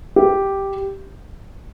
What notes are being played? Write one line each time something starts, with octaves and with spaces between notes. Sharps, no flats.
G4